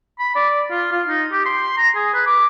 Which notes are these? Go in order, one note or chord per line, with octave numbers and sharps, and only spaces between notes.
B5
D5
F4
F4
D#4
G4
C6
A#5
G#4
B4
D6